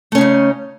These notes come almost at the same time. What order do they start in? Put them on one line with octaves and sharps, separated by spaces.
A3 C#4 C#3 D#4